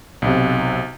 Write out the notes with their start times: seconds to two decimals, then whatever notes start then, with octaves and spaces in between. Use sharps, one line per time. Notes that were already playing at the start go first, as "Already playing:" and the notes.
0.22 B1 C3